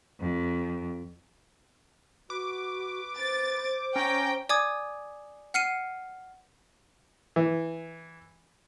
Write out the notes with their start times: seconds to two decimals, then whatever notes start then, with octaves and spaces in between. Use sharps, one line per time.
0.20 F2
2.30 F#4 B4 D6
3.17 C5 A6
3.96 C#4 G5 A#5 D6
4.49 D5 G#5 D6 D#6 G#6
5.54 F#5 F6 C7 C#7 D#7
7.36 E3